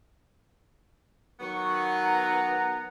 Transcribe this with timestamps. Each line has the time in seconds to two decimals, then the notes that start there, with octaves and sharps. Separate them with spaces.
1.40 D#3 F#3 B3 C#6
2.03 F#5 A#5